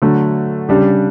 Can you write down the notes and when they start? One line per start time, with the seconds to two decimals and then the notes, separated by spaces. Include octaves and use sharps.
0.02 D3 F#3 A3
0.69 C#3 G3 D4 G4